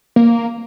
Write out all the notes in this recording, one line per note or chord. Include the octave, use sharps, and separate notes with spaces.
A#3